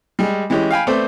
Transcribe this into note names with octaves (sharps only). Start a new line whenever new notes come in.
G3 G#3
E3 G#3 C#4 G4
F5 G5 G#5 B5
A3 B3 C4 C5 D5